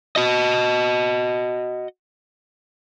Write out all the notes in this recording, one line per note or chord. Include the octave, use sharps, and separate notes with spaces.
F#4 D#5